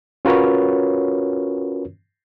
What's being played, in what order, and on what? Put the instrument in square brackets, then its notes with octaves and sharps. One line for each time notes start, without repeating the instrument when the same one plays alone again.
[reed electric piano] C#4 F4 F#4 A#4 B4 C#5